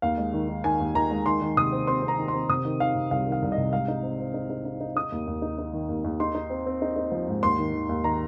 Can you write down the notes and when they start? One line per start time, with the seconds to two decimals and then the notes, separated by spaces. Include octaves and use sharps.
0.02 D#2 F5
0.18 G#3
0.33 D#3
0.48 D#3
0.64 D#3 G#5
0.80 D#2
0.95 D#3 A#5
1.11 G#3
1.26 D#3 C6
1.41 D#3
1.57 C3 D#6
1.72 C4
1.87 C4 C6
2.03 C4
2.08 A#5
2.18 D#3
2.28 C6
2.34 C4
2.49 C3 D#6
2.65 D#3
2.80 D#3 F5
2.95 C3
3.11 C2 F5
3.27 D#3
3.32 F5
3.42 C2
3.52 D#5
3.58 C3
3.73 G#2 F5
3.88 D#4
4.03 C4
4.19 C4
4.34 D#4
4.50 D#4
4.65 D#4
4.81 D#4
4.96 D#4 D#6
5.12 D#2
5.27 D#2
5.42 D#4
5.58 D#4
5.73 D#3
5.89 D#2
6.04 D#2
6.20 D#4 C6
6.35 D#4
6.50 C4
6.66 C4
6.82 D#4
6.96 D#4
7.12 F3
7.28 G#2
7.43 D#2 C6
7.59 D#3
7.74 D#3
7.89 D#2
8.04 D#3 A#5